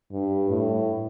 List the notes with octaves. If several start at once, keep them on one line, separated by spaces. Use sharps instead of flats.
G2
A2